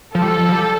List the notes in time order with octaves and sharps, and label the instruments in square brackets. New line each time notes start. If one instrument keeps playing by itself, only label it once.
[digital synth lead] F3 [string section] A4
[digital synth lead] G3
F3
F3
G3